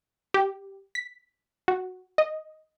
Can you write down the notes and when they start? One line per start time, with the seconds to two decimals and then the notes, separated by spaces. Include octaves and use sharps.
0.34 G4
0.95 B6
1.68 F#4
2.18 D#5